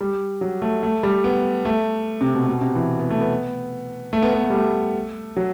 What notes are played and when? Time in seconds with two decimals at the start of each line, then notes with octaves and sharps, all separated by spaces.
0.01 G3
0.41 F#3
0.62 A3
0.83 A3
1.03 G3
1.24 B3
1.65 A3
2.21 C3
2.34 B2
2.48 B2
2.61 C3
2.75 E3
2.99 B3
3.10 A3
3.21 B3
4.13 A3
4.22 B3
4.33 B3
4.44 A3
4.50 G3
4.54 A3
5.36 F#3